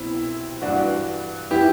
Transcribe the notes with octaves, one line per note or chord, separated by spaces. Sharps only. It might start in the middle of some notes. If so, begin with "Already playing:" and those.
Already playing: C2 B2 C4 E4
G2 E3 D4 F#4
E3 E4 G4